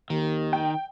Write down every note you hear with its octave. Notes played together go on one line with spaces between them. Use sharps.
D#2 D#3
G5